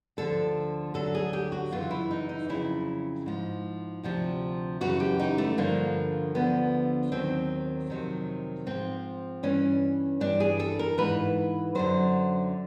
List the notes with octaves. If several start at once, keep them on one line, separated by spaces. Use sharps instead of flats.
D2 D3 F3 A4
D2 D3 F#3 A4
G#4
G4
F#4
F#2 C#3 E3 F4
E4
D#4
D#4
F2 C#3 F#3 E4
G#2 F3
D2 C3 F3
F#2 C#3 E3 F#4
G4
D#4
A3
G2 D3 F3 A#3
D2 D3 F3 B3
D#2 D#3 F#3 C4
F2 C3 D#3 F#3
G#2 F3 C4
G2 E3 C#4
G2 E3 D4
G#4
A4
A#4
G#2 E3 B4
F#2 D3 F#3 C5